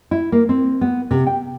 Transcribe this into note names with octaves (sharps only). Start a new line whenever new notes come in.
E4
A#3
C4
B3
C3
G5